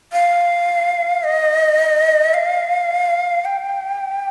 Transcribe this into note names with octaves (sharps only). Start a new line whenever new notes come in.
F5
D#5
F5
G5